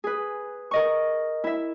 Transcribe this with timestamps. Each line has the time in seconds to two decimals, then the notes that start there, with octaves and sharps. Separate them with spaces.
0.04 G#4 B4
0.71 A#4 D#5 C#6
1.44 E4 E5